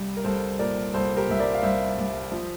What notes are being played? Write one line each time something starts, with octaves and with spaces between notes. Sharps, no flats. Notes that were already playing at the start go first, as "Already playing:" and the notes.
Already playing: C2 G3 G4
A#4
C2 A4 C5
A#2 A#4 D5
C2 A4 C5
G4 A#4
C2 E5
A#4 D5
F5
C2 C5 E5
C2
F3